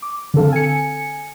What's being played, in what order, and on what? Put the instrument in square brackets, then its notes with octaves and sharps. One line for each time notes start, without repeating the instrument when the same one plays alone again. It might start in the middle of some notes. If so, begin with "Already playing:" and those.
[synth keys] D6
D3 C4 A4 F5
G#5 C#7